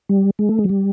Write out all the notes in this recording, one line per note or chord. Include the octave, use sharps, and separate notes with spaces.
G3
G#3
A3
G#3
F#3
G3